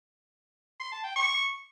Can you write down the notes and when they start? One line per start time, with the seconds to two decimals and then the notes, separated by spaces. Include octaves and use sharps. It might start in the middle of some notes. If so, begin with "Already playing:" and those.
0.80 C6
0.92 A5
1.04 G5
1.16 C#6